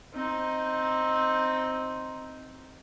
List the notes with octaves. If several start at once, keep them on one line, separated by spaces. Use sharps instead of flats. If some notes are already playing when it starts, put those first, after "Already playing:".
C4 D#4